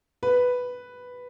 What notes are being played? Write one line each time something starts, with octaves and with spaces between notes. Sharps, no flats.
B4